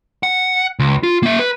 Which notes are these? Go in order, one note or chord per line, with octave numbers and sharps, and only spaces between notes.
F#5
C#2
F4
A#3 E5
B4